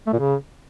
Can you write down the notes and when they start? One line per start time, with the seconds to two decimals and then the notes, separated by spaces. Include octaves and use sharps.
0.07 A3
0.13 A#2
0.19 C#3